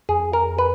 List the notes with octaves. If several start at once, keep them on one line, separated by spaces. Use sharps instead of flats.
F2 G#4
A#4
B4